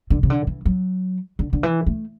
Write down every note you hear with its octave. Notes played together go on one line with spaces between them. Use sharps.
D3
C#3
D3
E3
F#3
D3
D3
E3
A3